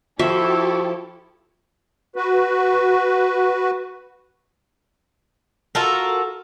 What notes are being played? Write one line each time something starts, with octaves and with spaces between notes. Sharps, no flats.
F3 E4 F#4 G4 A4 E5 C#6
F#4 B4
F4 F#4 A4 A#4